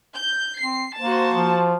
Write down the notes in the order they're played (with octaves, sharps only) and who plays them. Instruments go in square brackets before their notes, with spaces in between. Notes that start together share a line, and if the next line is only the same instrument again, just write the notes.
[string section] G6
[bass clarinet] C4 [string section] C7
[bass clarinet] A#3 [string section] F#4 C5 A5
[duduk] F3